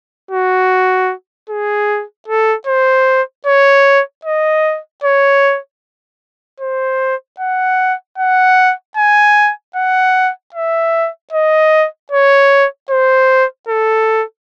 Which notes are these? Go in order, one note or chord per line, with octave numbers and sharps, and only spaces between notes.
F#4
G#4
A4
C5
C#5
D#5
C#5
C5
F#5
F#5
G#5
F#5
E5
D#5
C#5
C5
A4